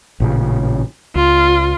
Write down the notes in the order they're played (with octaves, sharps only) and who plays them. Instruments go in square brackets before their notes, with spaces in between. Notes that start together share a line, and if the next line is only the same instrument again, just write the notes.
[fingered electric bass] A1 A#2 C#3
[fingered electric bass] C#2 [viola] F4